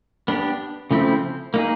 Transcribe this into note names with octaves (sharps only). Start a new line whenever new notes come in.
B3 D4 G4
C#3 F3 A3 C4 E4
A#3 D#4 G#4